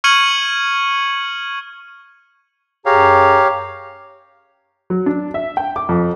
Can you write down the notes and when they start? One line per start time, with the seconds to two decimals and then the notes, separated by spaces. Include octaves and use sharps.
0.04 C#6 F6 G#6 C#7 D#7 F#7
2.86 F#2 G4 G#4 C#5 F5 A#5
4.90 F#3
5.06 D4
5.34 E5
5.57 G5
5.76 D6
5.89 F2